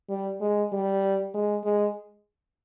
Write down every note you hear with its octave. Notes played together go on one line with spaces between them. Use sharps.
G3
G#3
G3
G#3
G#3